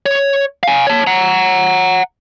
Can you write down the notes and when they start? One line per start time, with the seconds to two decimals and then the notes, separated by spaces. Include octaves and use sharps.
0.06 C#5
0.63 F5 G#5
0.87 C#5 A5
1.07 F#5 A#5